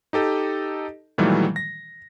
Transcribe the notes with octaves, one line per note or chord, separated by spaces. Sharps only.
D#4 G4 A4 D#5
A#2 D#3 E3 F#3 G3 A3
A#6